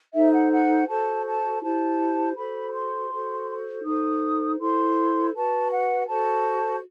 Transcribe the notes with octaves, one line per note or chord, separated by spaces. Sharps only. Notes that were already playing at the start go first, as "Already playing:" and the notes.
D#4 A4 C5 E5
F#5
F#5
F#4 A4 C5 A5
A5
E4 G4 C5 A5
F#4 A4 C5 B5
C6
F#4 A4 C5
D#4 A4 C5 D#6
E4 A4 C5 C6
F#4 B4 A5
F#5
F#4 A4 C5 A5